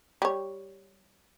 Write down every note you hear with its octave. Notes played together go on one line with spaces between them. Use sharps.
G3 C#5